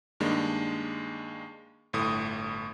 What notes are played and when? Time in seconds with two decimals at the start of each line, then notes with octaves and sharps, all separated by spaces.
0.20 G2 D#3 G#3 A#3 D4
1.93 G1 A2 D#6